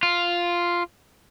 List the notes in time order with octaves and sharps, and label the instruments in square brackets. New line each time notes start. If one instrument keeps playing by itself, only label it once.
[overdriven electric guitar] F4